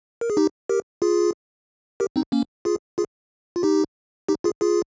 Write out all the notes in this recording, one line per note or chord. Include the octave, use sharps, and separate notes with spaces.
A#4
G#4
D#4 G4
G4 A#4
F4 G#4
G4 A#4
C4 D#4
A#3 C#4
F4 G#4
F4 G#4
F4
D#4 G4
D#4 G4
F4 G#4
F4 G#4